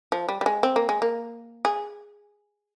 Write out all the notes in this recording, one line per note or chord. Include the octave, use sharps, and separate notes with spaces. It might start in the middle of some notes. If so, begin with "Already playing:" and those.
F3
G3
G3
G#3
C4
A#3
G#3
A#3
G#4